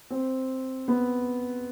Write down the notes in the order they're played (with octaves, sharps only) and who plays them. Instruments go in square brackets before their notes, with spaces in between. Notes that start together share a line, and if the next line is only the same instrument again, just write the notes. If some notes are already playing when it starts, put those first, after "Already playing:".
[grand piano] C4
B3